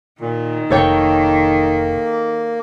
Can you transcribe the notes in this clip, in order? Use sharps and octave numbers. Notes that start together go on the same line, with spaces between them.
A#2 D#3
F1 A#3 A4 C#5 G5